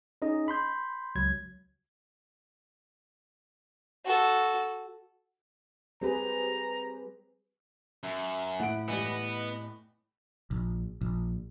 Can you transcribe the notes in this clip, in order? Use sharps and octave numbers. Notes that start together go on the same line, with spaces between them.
C#4 D#4 G#4 D#5
B5 C6 G6
C#2 F#3 G#6
F#4 A4
G3 C4 G4 G#4 B4 A#5
F#2 E5
A2 F#5 D7
E3 G3 B3 D#5
A#1
A#1